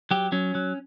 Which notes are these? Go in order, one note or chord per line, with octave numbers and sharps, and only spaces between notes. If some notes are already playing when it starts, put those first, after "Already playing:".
F#3 G4
F#3 C#4
F#3